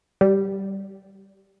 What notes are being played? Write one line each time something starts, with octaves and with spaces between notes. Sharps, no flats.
G3